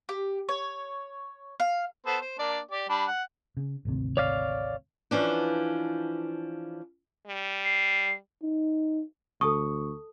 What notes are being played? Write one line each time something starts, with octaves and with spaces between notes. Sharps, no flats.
G4
C#5
F5
B3 A4 C5
C5
A#3 D4 D5
G4 D5
G3 D4 B5
F#5
C#3
G#1 D2 C3
C#5 D5 F5
E3 F3 C#4 D4
G3
C7
D#4
D2 A4 A5 C#6 D#6